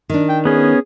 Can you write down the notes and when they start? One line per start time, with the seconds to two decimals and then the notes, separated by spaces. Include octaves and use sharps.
0.10 D#3 D4
0.29 G5
0.45 B3 C#4 G#4